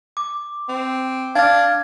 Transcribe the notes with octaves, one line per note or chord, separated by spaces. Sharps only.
D6
C4
D4 F5 F6 G#6 A6